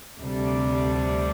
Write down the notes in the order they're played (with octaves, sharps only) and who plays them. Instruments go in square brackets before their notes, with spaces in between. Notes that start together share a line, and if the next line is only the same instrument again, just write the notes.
[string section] D2 C3 G3 D4